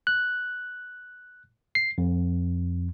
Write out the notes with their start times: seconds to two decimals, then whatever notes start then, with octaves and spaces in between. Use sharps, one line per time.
0.07 F#6
1.75 C7
1.98 F2